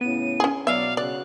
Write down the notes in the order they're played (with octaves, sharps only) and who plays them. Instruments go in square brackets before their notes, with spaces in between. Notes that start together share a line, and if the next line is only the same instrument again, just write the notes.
[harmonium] A2 C#3 [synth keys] B3 [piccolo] D#7
[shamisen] C#4 G#4
[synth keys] B2 B3 [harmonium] F#3 D5 [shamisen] E5 [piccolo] F5
[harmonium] C#3 F#4 [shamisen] D5 [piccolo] F#6